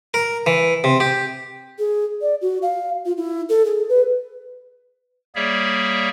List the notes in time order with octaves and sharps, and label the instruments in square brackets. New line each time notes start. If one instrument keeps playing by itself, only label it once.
[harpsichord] A#4
E3
C3
G4
[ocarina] G#4
D5
F#4
F5
F4
E4
A4
G#4
B4
[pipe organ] G3 A#3 G#4 C#5 D5 E5